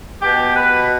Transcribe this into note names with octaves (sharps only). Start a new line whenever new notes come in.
B2 G4
B4